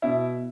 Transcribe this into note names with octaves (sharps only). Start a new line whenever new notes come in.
B2 E4